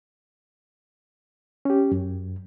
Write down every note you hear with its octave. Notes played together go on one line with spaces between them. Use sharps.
C#4 G4
F#2